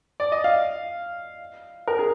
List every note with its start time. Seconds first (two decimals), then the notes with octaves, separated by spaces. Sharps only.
0.20 D5
0.32 D#5
0.44 F5
1.87 A#4
1.99 G#4